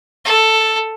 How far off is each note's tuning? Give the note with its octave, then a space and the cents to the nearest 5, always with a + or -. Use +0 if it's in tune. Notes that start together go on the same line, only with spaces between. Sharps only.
A4 +5